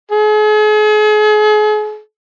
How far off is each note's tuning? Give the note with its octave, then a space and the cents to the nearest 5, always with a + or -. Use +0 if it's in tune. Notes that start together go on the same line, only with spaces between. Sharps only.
G#4 +40